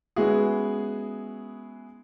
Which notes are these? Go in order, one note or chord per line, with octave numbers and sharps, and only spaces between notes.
G#3 B3 C#4 E4 F#4 G#4